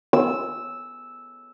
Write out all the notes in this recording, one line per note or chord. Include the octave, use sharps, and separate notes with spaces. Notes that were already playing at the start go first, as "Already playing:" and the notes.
E6